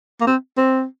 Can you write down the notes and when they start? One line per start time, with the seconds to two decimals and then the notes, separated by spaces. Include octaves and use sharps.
0.21 A#3
0.27 C4
0.58 C4